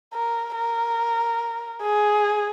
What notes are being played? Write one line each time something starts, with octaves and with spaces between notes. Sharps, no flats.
A#4
A#4
G#4